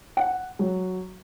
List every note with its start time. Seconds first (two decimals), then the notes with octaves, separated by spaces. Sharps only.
0.17 F#5
0.59 F#3